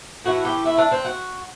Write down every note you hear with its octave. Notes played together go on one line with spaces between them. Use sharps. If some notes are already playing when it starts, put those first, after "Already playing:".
A2 E3 A3 F#4
G4
E4
D4
C4
F#4